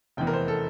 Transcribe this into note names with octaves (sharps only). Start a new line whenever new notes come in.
F1 E2 E3 G5
A#4
C5
A4